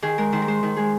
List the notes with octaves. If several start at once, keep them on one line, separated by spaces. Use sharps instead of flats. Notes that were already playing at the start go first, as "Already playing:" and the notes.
D#3 G#4
G#3 A#4
D#3 C5
A#4
G#3 C5
D#3 A#4
G#3 G#4